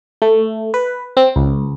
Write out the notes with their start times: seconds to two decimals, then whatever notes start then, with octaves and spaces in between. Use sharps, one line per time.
0.22 A3
0.74 B4
1.17 C4
1.36 C#2